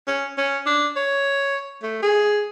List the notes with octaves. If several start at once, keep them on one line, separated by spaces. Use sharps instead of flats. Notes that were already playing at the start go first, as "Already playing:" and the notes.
C#4
C#4
D4
C#5
A3
G#4